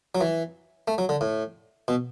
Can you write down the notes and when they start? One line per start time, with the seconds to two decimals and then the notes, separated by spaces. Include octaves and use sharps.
0.15 F#3
0.21 E3
0.88 A3
0.98 F#3
1.09 D3
1.21 A2
1.88 B2